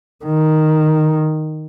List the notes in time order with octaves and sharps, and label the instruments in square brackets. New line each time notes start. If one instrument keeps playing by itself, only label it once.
[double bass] D#3